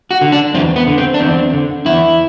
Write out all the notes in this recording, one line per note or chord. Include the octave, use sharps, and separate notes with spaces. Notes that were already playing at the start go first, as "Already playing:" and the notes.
F#4
D3
D4
E2 C4
B3
D3
C4
D4
E2 C4
D3
E2 E4